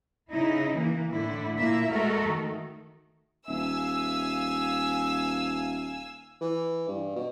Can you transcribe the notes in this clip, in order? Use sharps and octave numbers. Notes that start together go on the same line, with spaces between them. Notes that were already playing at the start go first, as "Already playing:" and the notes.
C#3 D#4 E4
E3 A#3
A2 D3 E4
A#2 A#3 E4 E5
G#3 A3 F#4 A4 A#4
D#3
D#1 E5 F5 G#5 E6
E3
G2
B2